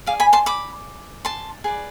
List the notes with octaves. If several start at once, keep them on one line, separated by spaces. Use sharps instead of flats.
G#4 D5 F5
G#5 B5
A5 C6
B5 D6
A5 C6
G#4 B4 D5